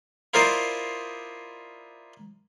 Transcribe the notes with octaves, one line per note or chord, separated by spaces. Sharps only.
E4 F4 A#4 C5 D5 D#5